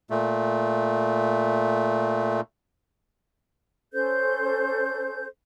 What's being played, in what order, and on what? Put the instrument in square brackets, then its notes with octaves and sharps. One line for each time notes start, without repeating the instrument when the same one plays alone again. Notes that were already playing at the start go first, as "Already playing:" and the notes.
[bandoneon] A#2 A3
[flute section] C#4 A4 C5 G6